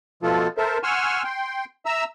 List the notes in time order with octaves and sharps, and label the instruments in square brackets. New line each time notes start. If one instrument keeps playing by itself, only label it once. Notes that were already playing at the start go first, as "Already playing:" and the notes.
[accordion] B2 F3 A3 F4 A4
A4 A#4 C5 E5
F#5 G#5 C6 C#6 E6 F6
G5 C6
E5 A#5 E6